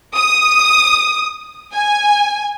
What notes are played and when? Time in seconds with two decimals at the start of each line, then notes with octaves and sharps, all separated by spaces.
0.15 D#6
1.73 G#5